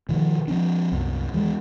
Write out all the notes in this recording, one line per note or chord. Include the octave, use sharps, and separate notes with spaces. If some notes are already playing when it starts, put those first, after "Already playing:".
B2 D#3 F3
F3 C4 D4
C2 F#2
E2 E3 F#3 G#3